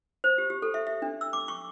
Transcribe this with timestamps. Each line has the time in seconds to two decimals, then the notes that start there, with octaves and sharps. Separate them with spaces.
0.24 C5
0.38 G4
0.50 G4
0.62 A4
0.74 E5
0.87 E5
1.02 D4
1.21 E6
1.33 D6
1.48 C#6